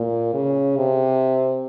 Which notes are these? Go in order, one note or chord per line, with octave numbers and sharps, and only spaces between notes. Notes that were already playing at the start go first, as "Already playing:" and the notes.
Already playing: A#2
C#3
C3